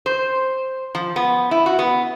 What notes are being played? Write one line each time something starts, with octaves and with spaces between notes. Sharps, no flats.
C5
F3
B3
E4
F#4
B3